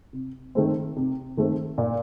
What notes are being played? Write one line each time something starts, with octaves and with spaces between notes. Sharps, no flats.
C3
D#3 A3 C4
C3
D#3 A3 C4
A#2